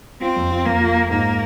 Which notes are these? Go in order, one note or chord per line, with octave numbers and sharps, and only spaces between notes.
C4 F4
F2
F4
F2 A#3
F4
F4
G#2 A#3